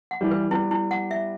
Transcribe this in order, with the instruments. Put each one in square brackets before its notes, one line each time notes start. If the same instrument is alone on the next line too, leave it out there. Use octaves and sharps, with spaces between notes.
[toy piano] F#5
[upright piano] E3 G3
[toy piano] B4
[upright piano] G3 B3 [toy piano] E4
[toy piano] E4
F#5
E5